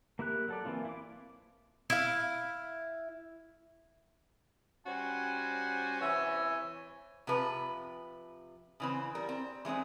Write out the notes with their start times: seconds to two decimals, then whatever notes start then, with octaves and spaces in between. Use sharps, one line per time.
0.19 A#3 E4 G4 A#4 F#6
0.48 F#3 A4 D5
0.65 E3 A#3 C4 F4
0.85 E4 D6
1.90 E4 F5
4.87 G3 C#4 F#4 C5 G#5
6.01 C3 E3 C#5 E5 G#5
7.27 C3 F3 B4
8.80 C#3 E3 C4
9.15 G3 A#4
9.29 C4
9.65 E3 G#3 C4 D#4